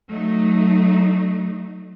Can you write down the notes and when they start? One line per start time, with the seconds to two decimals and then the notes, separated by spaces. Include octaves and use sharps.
0.10 F#3 A3 D#4